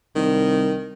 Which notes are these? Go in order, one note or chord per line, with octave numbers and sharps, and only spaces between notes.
C2 D#3